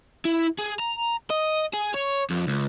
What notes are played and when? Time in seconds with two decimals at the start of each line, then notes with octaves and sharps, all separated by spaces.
0.25 E4
0.59 G#4
0.79 A#5
1.30 D#5
1.73 G#4
1.94 C#5
2.30 F2
2.47 C#2